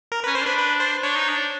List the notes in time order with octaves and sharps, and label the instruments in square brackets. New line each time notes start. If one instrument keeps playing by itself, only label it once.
[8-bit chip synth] A#4
[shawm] C#4 [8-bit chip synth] B4
[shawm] C#4 [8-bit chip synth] C5
[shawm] D4 [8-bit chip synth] B4
[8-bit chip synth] B4
C5
[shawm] D4 [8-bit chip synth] C#5
[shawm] D#4
D4